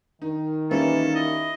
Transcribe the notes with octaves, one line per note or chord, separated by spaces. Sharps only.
D#3 D#4
E3 G3 A#3 C#4 A4
E4 D#5